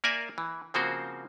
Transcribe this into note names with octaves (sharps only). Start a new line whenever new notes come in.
A#3 A#4 D5 E5 G#5
E3
C#3 F3 A#3 C4 F#4 C5